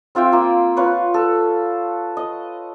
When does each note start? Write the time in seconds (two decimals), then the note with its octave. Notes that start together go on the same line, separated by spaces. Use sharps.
0.15 C4 F4 E5 G5
0.32 A#3 F4
0.76 F4 B4 C#5 F#5
1.14 A4
2.17 D#5